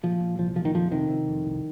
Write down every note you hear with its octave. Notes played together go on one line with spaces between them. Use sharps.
A#2 F3
A#2
C2 F3
A#2 F3
D#3
F2 F3
C3 D#3
C3
F2
C2